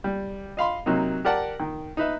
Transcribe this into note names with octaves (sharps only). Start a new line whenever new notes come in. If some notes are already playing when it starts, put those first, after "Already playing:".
G3
D#5 F5 B5 C6
C3 F#3 A#3 D#4
G4 A#4 D5 F#5 A5
D#3
D#4 B4 E5